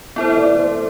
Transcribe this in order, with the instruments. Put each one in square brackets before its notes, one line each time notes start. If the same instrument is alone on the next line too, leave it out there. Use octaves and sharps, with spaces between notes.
[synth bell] B3 E4 A4 C5 [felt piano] E5
[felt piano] E5
D5
C5